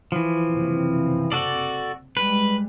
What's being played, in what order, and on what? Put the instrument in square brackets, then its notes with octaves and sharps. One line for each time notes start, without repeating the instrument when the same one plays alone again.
[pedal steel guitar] E3 F3
[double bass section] F#1 C3 C4
[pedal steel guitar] F#4 A4 D5
[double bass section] G3 G#3 [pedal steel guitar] B4